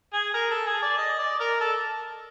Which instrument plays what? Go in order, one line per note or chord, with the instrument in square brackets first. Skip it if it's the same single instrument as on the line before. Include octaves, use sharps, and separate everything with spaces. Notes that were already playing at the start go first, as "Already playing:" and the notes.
[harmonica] G#4
A#4
A4
G#4
D5
D#5
D5
A#4
A4